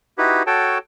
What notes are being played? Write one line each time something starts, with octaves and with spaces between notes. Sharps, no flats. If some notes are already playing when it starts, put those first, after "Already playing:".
D#4 E4 F#4 G4 B4
F#4 A4 C#5 G5 A5